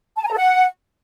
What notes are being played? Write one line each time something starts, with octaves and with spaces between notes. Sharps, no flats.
A5
G#5
A#5
A4
F#5